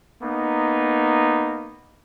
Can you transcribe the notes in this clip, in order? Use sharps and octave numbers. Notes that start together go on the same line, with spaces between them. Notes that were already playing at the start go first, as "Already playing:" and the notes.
A#3 B3 D#4